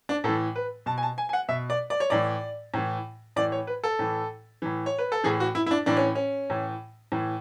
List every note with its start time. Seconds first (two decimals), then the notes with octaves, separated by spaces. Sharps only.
0.09 D4
0.24 A2 E3 A4
0.56 B4
0.86 B2 A5
0.98 G#5
1.03 A5
1.18 G#5
1.29 G#5
1.33 F#5
1.49 B2 E5
1.70 D5
1.90 D5
2.00 C#5
2.10 A2 E3 D5
2.74 A2 E3
3.36 A2 E3 D5
3.52 C#5
3.67 B4
3.84 A4
3.99 A2 E3
4.62 A2 E3
4.86 C#5
4.99 B4
5.12 A4
5.24 A2 E3 G#4
5.40 F#4
5.55 E4
5.66 E4
5.71 D4
5.86 A2 E3 D4
5.97 C#4
6.15 C#4
6.50 A2 E3
7.12 A2 E3